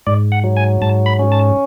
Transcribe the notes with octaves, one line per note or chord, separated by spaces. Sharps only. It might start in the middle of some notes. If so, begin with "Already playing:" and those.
G#2 D5
F#5
F#3
G#5
G#2 A5
B5
C#4
A5